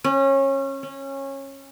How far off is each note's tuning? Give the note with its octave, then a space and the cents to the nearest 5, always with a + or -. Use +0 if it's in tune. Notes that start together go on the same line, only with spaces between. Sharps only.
C#4 -25
C#4 -20